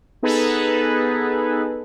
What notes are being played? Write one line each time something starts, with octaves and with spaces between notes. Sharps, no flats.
B3 D#4 G#4 A4 B4